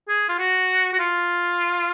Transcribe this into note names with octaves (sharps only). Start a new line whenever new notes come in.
G#4
F4
F#4
F#4
F4